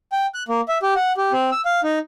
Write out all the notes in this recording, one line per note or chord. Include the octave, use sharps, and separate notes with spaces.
G5
F#6
A#3
E5
G4
F#5
G4
C4
E6
F5
D#4